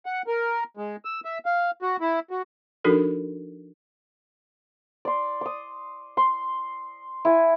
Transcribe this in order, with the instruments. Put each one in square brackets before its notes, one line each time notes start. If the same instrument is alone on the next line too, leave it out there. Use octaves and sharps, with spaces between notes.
[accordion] F#5
A#4
G#3
E6
E5
F5
F#4
E4
F#4
[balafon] F3 D4 D#4 F#4 A4 A#4
[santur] D5 C6
D6 D#6
C6
E4 G#5